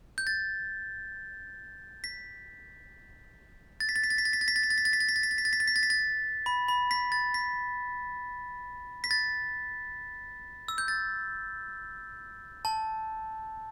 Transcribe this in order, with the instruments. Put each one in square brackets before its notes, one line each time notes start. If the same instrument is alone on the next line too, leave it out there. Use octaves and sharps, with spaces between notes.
[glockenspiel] G6
A6
B6
A6
B6
A6
B6
A6
B6
A6
B6
A6
B6
A6
B6
A6
B6
A6
B6
A6
B6
A6
B6
A6
B6
A6
B6
A6
B6
A6
B6
A6
B5
B5
B6
A6
B6
B6
A6
E6
G6
A6
A5